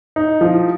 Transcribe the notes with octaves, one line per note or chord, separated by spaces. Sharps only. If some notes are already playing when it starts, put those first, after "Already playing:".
D#4
F3